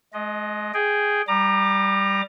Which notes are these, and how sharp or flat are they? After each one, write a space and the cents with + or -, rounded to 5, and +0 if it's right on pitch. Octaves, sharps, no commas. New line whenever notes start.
G#3 +35 D#5 +0
G#4 +0 G5 +0
G3 +0 A#5 +0 D6 +35